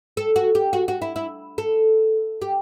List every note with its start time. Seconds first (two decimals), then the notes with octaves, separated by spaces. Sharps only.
0.17 A4
0.36 F#4
0.55 G4
0.73 F#4
0.88 F#4
1.02 E4
1.16 E4
1.58 A4
2.42 G4